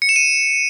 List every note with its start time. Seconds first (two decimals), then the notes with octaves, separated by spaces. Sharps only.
0.02 C#7
0.09 E7
0.16 D#7